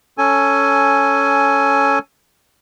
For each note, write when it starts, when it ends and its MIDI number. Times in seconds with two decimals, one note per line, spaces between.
0.18 1.99 61
0.18 1.99 69
0.18 1.99 80